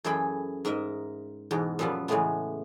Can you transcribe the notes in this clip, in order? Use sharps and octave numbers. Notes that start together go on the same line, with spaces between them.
F#2 E3 G#4 A4 G5 B5
G#2 A#4 D#5 E5
E2 G#2 B2
F#2 A#2 F3 G3 B3
E2 A2 C#3 G#3 A3 B3